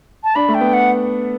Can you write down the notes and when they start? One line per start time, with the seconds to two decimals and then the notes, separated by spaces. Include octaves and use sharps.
0.24 A5
0.35 D4 B5
0.49 A3
0.54 G5
0.61 B3
0.73 F#5